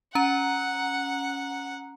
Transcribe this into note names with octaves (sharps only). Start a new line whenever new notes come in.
C#4 F#5 A#5